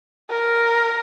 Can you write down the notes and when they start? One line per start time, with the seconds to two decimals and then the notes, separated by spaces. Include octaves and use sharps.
0.31 A#4